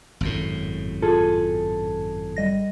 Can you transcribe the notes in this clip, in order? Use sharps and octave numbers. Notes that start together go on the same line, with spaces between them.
G#1 F#2 A2
F4 G#4 A4
G3 D#5 A#6